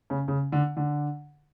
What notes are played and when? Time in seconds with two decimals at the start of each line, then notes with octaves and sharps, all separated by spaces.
0.10 C#3
0.28 C#3
0.52 D3
0.77 D3